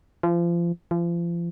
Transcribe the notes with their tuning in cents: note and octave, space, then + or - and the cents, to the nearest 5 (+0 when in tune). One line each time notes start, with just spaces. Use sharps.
F3 -30
F3 -35